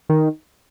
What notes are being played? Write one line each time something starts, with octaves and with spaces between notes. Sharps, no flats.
D#3